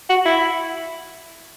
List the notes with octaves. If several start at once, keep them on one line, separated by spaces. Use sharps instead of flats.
F#4
E4